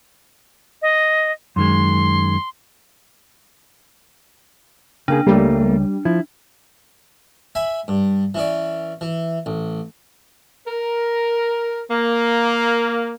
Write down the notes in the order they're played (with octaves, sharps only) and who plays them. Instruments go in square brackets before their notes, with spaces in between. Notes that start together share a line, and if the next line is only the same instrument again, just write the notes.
[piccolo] D#5
[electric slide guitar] F#2 D#3 G#3 [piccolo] C6
[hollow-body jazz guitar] C#3 A#3 G#4 [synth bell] D4
[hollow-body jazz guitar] C#2 [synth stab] G3 [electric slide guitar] A3 A#3
[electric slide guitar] F3 [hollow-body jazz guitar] E4
[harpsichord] E5 G#5 B5
G2
E3 C#4 D5
E3
A1
[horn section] A#4
A#3